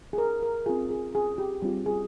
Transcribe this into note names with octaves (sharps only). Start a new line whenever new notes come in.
G#4
A#4
A#4
C4 F4 G#4
G#4
G#4
G4
G3 C4 F4 G4
G#4